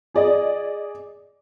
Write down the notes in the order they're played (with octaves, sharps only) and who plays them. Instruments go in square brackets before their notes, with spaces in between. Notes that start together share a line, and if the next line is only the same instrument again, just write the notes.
[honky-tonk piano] G#4 D5 D#5